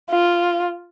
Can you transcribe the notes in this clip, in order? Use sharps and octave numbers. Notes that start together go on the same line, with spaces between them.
F4